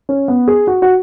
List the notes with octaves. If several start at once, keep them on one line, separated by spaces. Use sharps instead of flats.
C#4
B3
G#4
F#4
F#4